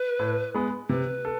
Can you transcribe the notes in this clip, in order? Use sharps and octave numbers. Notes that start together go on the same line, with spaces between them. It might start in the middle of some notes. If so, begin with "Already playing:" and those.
Already playing: B4
A2
G#3 B3
C3 B4
A4